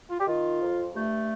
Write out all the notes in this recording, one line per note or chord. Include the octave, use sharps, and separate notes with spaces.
F4
G4
D#3 F4
F2
G2 A3